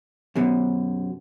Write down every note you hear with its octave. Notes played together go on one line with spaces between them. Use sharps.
F#2 B2